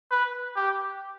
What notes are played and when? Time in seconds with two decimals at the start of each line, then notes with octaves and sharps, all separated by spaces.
0.11 B4
0.56 G4